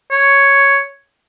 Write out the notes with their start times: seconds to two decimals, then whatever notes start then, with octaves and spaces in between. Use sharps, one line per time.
0.11 C#5